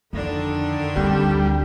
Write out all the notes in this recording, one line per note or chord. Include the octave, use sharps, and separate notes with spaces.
F2 D3 D#3 D4
D2 G3 C4